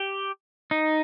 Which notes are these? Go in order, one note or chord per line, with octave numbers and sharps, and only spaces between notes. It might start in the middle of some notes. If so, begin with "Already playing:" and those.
Already playing: G4
D#4